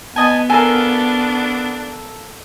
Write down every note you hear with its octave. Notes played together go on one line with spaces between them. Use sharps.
B3 D#5 G#5 A5
D4 A4 A#4 F5 G#5